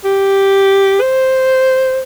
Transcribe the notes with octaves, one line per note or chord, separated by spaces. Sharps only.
G4
C5